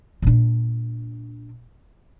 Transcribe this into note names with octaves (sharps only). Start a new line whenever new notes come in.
A#2 D4